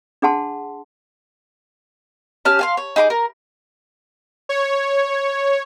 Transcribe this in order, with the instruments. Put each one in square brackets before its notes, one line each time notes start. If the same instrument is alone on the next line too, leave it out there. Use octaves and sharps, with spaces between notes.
[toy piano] D4 G#4 F#5 A5 C6
[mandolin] C#4 G4 A5 F6
F5 G#5 C6
C#5
D#4 G#4 B5 D6
A#4
[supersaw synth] C#5